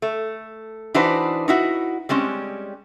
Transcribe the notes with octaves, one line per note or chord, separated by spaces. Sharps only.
A3
E3 D4 D#4 F#4 B4 C5
D#4 E4 F#4
G3 G#3 C4 C#4